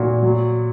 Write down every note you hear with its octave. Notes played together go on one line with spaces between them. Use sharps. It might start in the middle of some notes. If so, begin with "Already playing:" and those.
Already playing: A#2 F#4
F#3